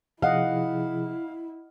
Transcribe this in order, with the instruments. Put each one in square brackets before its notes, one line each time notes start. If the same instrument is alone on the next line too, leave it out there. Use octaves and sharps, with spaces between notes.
[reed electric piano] C3 F3 G#4 [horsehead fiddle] E4 [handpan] D#5 F#5 [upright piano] F5